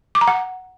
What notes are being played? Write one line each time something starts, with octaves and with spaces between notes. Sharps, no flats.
D6
A#5
F#5